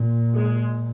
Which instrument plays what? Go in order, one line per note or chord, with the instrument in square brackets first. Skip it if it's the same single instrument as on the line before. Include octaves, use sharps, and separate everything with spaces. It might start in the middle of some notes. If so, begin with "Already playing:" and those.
Already playing: [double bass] A#2
[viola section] G#3